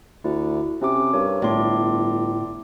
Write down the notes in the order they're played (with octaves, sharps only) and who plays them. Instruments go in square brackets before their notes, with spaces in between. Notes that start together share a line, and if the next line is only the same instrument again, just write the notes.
[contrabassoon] D2 [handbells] E4
[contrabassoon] C3 [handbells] C#4 D6
[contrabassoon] G2 [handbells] A#4 C#5
[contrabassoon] G1 [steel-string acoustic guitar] A2 [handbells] D5 C6 D6